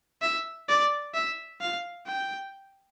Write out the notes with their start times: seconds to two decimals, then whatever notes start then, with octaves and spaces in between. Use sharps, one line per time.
0.22 E5
0.68 D5
1.14 E5
1.61 F5
2.07 G5